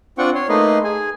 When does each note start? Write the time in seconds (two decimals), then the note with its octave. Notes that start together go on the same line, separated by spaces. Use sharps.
0.18 C4 D4 F4 F#5 G5 C#6
0.35 C#5 C6
0.49 A3 A#3 D#4 B4 D#5 C6
0.84 G#4 G#5